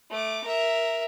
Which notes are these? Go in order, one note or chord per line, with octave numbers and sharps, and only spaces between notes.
A3 D6
A#4 E5